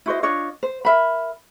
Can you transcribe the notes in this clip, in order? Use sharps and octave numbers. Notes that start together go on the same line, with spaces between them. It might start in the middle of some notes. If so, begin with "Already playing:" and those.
E4 F#4 C5 D#5
D4 F4 C#5 D#5
C5
A#4 E5 B5